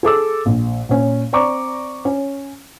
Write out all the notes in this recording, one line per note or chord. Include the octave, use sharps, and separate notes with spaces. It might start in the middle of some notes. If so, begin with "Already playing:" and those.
G#4 A4 D6 E6
A#1
A#2 C#4
C4 D5 A#5 C#6 D6
C#4